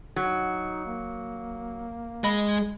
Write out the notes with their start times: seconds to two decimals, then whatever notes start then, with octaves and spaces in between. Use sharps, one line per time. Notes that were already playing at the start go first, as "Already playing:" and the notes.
0.16 F#3 D#4
0.86 A#3
2.24 G#3 D#5 B5